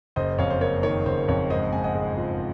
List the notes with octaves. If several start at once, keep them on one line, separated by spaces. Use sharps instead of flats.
F#1 C5 D#5
F2 C#5 F5
C5
A#3 C#5
D#3 C#5
F#1 C5
F2 C#5
G#1 C5 D#5
G#2 G#5
D#5 F#5
G#3
F3